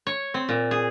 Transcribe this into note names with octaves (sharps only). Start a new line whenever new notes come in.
C#5
C4
A#2
G#4